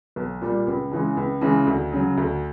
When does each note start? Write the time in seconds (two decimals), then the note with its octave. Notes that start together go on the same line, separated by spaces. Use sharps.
0.16 B1
0.41 A#2 G3
0.67 C#2
0.91 C#3 E3 G#3
1.17 C#2
1.41 C#3 E3 G#3
1.67 D2
1.92 C#3 F#3
2.17 D2